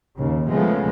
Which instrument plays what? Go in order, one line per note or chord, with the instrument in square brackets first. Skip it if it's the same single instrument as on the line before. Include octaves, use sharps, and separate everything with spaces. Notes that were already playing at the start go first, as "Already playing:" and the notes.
[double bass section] D#2 C#3
C#3 F3 G#3 A3 B3